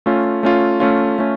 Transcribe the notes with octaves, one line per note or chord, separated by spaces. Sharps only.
A3 C#4 F4
A3 C#4 F4
A3 C#4 F4
A3 C#4